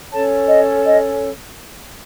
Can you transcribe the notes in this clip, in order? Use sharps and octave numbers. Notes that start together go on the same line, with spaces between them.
C#4 A4 C#5 A5
D#5
D#5